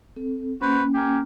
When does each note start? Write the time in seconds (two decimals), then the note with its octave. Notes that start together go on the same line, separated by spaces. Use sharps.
0.16 C4 A4
0.61 A#3 C#4 F#4 B4 C5
0.95 G4 A#4 G#5